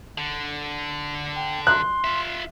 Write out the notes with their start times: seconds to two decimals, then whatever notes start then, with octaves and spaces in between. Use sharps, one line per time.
0.18 D3
1.36 G5
1.67 C6 F#6
2.04 F4 E5